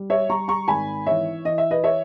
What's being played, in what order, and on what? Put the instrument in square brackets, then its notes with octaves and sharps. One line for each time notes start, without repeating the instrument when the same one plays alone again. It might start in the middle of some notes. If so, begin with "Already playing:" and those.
Already playing: [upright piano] G3
C#5 E5
G3 A#5 C#6
A#5 C#6
G#1 G#5 B5
E3 C#5 E5
E3 D#5
E5
B4 D#5
C#5 E5